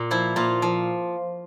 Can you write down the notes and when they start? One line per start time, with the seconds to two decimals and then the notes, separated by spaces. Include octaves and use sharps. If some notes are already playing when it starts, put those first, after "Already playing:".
Already playing: A#2
0.11 F3 E4
0.36 A#2 F4
0.62 F3